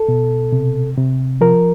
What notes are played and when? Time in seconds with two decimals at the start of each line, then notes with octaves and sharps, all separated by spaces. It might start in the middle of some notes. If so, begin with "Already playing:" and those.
Already playing: A4
0.09 B2
0.52 C3
0.97 C3
1.41 F3 A#4